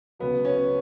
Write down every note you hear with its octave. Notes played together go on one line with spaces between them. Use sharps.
C#2 C#3 F#3 B3
C#4